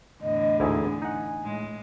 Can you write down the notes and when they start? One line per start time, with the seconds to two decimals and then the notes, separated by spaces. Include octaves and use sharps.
0.22 E2 A2 D3 D#5
0.60 D2 G#2 E4 G#4
1.02 D#4 F#5 G#5
1.43 A2 G#3